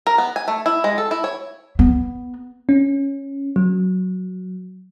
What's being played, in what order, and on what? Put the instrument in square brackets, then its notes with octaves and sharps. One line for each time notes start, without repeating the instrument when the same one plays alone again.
[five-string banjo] A#4
B3
G#5
A3
E4
G#3
A4
E4
C#5
[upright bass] B3
[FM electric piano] C#4
F#3